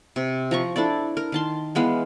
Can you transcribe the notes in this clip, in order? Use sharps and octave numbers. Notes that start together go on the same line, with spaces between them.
C3
F3 A#5 C#6
D4 E4 A4 D5
A#4
D#3 A5 C6
E3 G#3 B3 F5